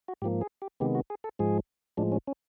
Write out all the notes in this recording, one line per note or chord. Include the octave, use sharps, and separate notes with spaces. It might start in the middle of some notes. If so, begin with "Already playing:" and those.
F#4
G#2 F3 A#3 G4
G#4
G4
C3 D#3 G#3 B3 G4
F#4
G#4
A4
G#2 F3 G#3 G#4
A2 F3 G#3 D4
C#4
C#4